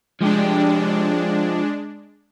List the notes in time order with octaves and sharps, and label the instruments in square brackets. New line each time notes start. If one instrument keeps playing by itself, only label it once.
[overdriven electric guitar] F3 G4 [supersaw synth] G#3 D4